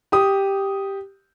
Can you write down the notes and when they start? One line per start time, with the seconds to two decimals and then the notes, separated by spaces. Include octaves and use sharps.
0.12 G4 D#6